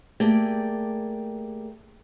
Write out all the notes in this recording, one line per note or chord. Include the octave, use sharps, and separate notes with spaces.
A3 A#3 G4 G#4 D5 G5